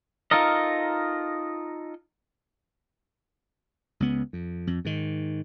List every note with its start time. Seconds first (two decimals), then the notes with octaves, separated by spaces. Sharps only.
0.31 D#4 F4 A4 A#4 D#5
4.00 C#2 B3
4.33 F2
4.67 F2
4.85 G#2 D#3